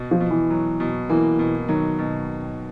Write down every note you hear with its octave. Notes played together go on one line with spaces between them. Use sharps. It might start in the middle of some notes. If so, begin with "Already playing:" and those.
Already playing: B2
F3
B2
E3
F#3
B2
E3 A#3
B2
D#3 F#3
B2